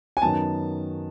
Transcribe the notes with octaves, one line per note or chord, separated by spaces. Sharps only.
G#5
F#2 D#3 F#3 B3 A5